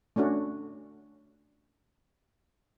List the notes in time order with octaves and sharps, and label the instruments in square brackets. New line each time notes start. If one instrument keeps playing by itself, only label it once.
[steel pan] A3 C#4 D4 F#4